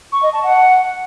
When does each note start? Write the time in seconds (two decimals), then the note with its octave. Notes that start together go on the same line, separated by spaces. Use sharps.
0.12 C#6
0.23 D#5
0.33 A5
0.43 F#5